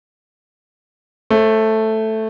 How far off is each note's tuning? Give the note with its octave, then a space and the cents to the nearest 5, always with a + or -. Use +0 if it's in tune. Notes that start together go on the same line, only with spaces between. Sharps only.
A3 +0 C5 +40